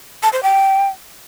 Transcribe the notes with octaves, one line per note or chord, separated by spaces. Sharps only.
A5
C5
G5